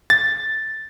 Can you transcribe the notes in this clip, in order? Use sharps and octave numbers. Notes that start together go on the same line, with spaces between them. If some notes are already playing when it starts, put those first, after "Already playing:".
A6